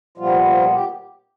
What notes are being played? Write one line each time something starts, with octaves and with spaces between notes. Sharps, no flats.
A#2 F3 G3 B3 F4
F3 F4
G4